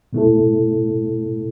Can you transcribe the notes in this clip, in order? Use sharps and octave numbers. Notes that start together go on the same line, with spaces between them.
B2 A3 E4 A4